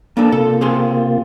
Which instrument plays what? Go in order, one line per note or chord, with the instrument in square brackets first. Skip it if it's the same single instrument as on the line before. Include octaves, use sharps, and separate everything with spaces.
[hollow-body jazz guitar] A#3 D4 A4 [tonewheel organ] A5
[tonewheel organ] C3 A#3 F4 [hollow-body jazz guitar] A4
[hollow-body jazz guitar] C4 G#4 C6